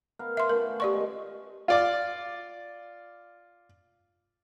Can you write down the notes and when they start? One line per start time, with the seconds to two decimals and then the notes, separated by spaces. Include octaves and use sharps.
0.19 B3 A#4 F5
0.37 E5 C6
0.50 A3 C#4 F4 A#4
0.80 G4 D5 C#6
0.92 D#3 G#3 D#5
1.68 F4 D5 D6